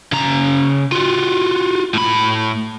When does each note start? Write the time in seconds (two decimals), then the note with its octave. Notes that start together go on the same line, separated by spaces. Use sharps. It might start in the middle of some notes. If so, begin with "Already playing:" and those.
0.12 C#3 A#5
0.92 F4 F#4
1.94 A2 B5